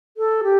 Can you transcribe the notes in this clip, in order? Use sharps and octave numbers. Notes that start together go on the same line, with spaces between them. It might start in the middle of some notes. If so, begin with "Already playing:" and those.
A4
G4